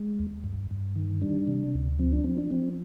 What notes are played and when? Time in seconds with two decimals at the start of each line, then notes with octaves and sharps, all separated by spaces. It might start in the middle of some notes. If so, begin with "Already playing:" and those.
Already playing: G#3
0.19 D#2
0.44 G2
0.71 G2
0.96 D#3
1.21 G3 D4
1.48 C3
1.74 D2
1.99 F3 C4
2.13 D4
2.24 F3 C4
2.38 D4
2.51 F3 C4